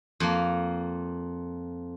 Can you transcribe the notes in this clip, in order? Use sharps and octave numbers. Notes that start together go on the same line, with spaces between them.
F2 A#3